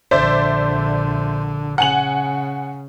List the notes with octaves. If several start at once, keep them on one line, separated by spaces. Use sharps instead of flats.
A#1 D3 C5 D5 E5
C#3 F#5 G#5 F#7